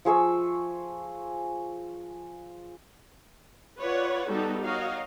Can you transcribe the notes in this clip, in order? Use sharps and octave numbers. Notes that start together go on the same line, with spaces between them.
F3 G#4 C#6 E6
F4 B4 C#5 D5 F#5
G3 B3 D#4 F#4 G4 A4
F#4 A#4 C#5 D#5 F5